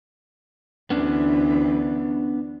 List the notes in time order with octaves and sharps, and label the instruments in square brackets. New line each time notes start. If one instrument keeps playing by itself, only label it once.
[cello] D2 E3 [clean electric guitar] B3 C#4 D4